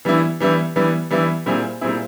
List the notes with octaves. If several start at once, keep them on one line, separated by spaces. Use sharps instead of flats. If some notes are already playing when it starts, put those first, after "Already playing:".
E3 G3 B3 E4
E3 G3 B3 E4
E3 G3 B3 E4
E3 G3 B3 E4
A#2 G3 C4 E4 G#4
A#2 G3 C4 E4 G#4